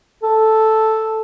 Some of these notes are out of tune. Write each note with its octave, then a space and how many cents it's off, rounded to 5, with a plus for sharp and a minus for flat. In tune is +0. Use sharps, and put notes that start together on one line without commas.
A4 +0